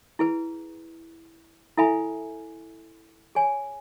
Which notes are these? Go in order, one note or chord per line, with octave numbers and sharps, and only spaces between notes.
E4 G#4 B4
E4 A4 E5 G#5 B5
G#4 C#5 G#5